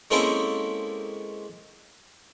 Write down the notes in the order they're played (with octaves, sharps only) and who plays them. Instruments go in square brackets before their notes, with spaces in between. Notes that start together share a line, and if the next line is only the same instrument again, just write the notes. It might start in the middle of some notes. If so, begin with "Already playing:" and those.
[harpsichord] G#3 A#3 C4 C#4 E4 A4